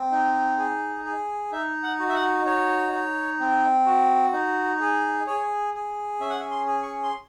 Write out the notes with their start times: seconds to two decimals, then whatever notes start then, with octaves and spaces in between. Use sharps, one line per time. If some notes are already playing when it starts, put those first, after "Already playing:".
Already playing: C4
0.11 D#4
0.58 G#4
1.04 G#4
1.52 D#4 E5
1.83 F#5
1.99 F#4
2.09 E5
2.15 F#5
2.45 D#4 C#5
2.92 D#4
3.40 C4
3.86 F#4
4.33 D#4
4.80 G#4
5.27 G#4 C#5
5.74 G#4
6.20 C#4 E5
6.30 F#5
6.40 E5
6.51 C6
6.67 G#4
6.83 C#6
7.03 C6